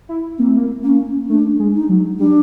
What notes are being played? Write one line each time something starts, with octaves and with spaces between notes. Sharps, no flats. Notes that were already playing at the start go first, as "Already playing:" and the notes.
E4
A#3 C4
A3
A#3
A#3 C#4
A3 D4
G#3
D#4
F#3
G3 D4